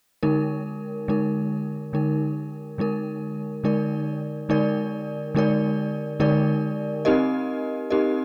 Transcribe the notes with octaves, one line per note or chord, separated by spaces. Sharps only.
D3 G#3 D#4 A#4
D3 G#3 D#4 A#4
D3 G#3 D#4 A#4
D3 G#3 D#4 A#4
D3 G#3 D#4 A#4 D5
D3 G#3 D#4 A#4 D5
D3 G#3 D#4 A#4 D5
D3 G#3 D#4 A#4 D5
C4 D#4 G4 A#4 D#5
C4 D#4 G4 A#4 D#5